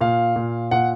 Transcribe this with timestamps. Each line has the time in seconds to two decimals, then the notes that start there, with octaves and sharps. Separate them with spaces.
0.01 A#2 F5
0.36 A#2
0.71 A#2 F#5